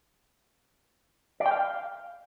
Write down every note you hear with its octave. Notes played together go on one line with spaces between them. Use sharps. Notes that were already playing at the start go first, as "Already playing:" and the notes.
D5
G5
F5